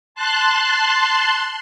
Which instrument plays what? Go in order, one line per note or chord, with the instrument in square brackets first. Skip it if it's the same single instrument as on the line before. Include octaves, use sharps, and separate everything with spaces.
[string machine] A5 C6 F#6